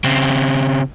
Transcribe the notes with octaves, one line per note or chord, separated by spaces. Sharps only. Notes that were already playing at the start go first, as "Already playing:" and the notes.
C#3 C4